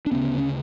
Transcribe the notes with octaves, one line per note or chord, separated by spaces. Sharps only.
D4
D2 C#3 B3 C#4
C#4